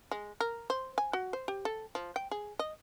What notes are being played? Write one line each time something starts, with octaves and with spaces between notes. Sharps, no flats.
G#3
A#4
C5
G#5
F#4
C5
G4
A4
F3
G5
G#4
D#5